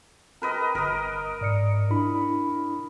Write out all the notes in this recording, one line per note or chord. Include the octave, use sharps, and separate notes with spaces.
A#4 B4 D#5
G1 A#4 D#5
G#2 D5 C#7
D4 E4 B5